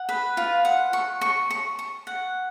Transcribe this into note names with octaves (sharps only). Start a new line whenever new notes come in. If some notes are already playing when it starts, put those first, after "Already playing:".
Already playing: F#5
B4
F4
F#5
C#6
C#6
C#6
C#6
F#5